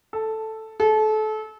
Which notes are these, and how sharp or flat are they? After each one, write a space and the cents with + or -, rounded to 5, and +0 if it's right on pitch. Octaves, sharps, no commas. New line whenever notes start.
A4 +0
A4 -30